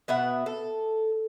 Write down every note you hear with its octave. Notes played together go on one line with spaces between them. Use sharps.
B2 B3 E5 F#5
A4